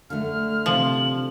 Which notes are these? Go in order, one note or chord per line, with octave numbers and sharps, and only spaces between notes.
D3 A3 F6
C3 F3 F#7